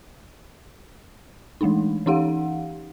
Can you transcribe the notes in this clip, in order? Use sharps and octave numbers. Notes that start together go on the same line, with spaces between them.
E3 G#3 A3 D4 D#4
E3 C#4 D#4 G4 F5 F#5